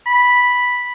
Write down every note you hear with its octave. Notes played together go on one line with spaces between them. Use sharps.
B5